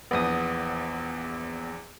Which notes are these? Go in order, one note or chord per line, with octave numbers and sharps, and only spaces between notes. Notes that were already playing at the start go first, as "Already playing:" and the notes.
A#1 E2 B3 D#6